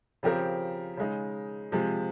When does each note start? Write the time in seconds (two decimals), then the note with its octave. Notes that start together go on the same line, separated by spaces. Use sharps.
0.23 C#3 F3 C4 G4 A#4
0.97 C#3 G#3 D#4
1.72 C3 F3 G#3